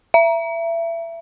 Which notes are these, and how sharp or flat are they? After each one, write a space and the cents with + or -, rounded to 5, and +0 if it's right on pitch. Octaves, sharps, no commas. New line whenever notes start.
E5 +25